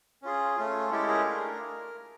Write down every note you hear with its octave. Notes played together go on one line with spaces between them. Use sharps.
C#4 F4 G#4
A3 C#4 F4
G#3 C#4 E4 G4 A4
G#4 A#4
A3 D4 F4 G#4